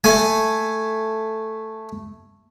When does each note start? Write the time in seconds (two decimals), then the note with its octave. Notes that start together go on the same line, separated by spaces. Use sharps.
0.04 A3 G#5